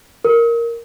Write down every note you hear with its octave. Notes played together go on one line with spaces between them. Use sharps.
A#4